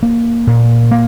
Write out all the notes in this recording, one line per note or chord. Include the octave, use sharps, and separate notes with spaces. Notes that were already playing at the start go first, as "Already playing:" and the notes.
A#3
A#2
A#3